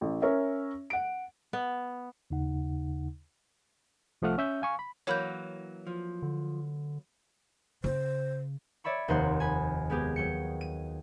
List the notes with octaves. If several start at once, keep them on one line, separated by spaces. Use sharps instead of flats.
A1
C#4 A#4 C#5 E5
F#5 D7
B3
D#2 C#3 D#4 F#5
C2 F3 A3 F#5 F6
C#4 E5 G6
F5 G#5 C#6
B5
E3 F#3 A#3 C#5 B5 G6
F3
D3
C#3 C5
C#5 D5 E5 B5 C#6
F1 D#2 A#3 C5 F#5
G#5 B5
G#3 B3 G4 G#4
F#3 G5 C#7
D#7